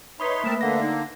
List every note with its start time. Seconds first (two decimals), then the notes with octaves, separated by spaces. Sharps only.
0.20 D#4 B4 C#5 E5 B5 C6 D#6 B6
0.44 A3 A#3 C4 A#4 A5
0.61 D3 A#3 F#5 A#6
0.81 D#4